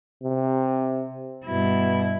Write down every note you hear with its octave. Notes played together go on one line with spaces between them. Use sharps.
C3
G2 B2 E4